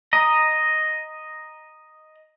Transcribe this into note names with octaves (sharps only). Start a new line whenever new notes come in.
D#5 A#5